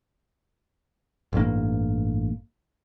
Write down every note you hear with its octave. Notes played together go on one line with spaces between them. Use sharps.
A1 G2 A#3